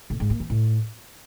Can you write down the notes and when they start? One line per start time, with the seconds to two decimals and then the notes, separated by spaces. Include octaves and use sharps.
0.10 A2
0.20 G#2
0.30 A#3
0.40 E3
0.50 A2